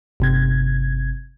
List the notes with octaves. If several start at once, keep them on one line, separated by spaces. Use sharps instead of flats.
G1 C3 G#6